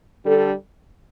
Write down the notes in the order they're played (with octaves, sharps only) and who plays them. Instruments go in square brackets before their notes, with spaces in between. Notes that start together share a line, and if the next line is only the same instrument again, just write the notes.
[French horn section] D3 G3 D4 A4